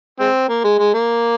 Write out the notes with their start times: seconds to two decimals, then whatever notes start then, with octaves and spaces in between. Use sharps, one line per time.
0.20 G#3 C4
0.49 A#3
0.64 G#3
0.79 G#3
0.94 A#3